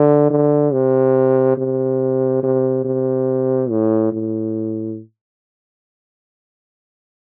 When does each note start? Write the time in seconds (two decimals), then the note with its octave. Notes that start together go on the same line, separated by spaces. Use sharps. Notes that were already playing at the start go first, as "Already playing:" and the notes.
Already playing: D3
0.30 D3
0.73 C3
1.58 C3
2.43 C3
2.85 C3
3.70 A2
4.13 A2